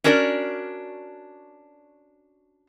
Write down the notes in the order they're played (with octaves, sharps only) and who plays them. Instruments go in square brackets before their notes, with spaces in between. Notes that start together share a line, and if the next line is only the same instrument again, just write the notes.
[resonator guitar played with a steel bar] C#4 D4 F#4 A#4 C#5 D5